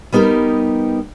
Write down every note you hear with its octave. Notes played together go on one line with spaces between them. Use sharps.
G3 B3 D#4 G4 A#4